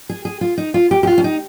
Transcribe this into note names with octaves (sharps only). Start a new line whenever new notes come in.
G#4
G#4
F4
D#4
F4
G4
G4
F4
C#4
D#4